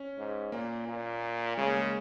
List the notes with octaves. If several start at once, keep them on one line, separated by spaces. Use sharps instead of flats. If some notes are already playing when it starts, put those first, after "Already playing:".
Already playing: C#4
G#2
A#2 A#3
A#2
C#3 G#3
A#3
G#3